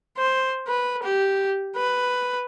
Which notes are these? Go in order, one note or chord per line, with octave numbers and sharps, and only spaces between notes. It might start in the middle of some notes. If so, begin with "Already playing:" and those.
C5
B4
G4
B4